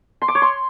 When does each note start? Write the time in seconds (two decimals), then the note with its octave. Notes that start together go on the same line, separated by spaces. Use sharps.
0.22 C6
0.28 D6
0.35 C#5
0.42 C6